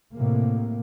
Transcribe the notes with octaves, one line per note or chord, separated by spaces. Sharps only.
A2 C3 A#3